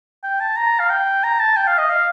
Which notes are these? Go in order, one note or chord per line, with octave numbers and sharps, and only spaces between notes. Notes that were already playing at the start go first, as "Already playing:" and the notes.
G5
A5
A#5
F5
G5
A#5
A5
G5
F5
D#5
F5